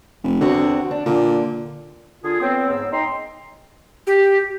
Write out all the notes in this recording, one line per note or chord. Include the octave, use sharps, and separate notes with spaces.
F1
E2 D3 C4 F#4
D4
A#2 D3
D3 F4 G#4 D#6
B3 C4 C#5
G#2 B3 E6
D#4 G5 A#5 C6
G4